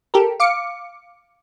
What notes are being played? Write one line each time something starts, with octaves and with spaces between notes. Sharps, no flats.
G4 A4 A#4
F5 D6 C#7